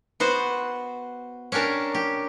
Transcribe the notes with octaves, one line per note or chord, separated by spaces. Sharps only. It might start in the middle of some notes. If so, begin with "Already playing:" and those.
B3 F#4 C5
C#4 D4 G4 A#4 A5
G4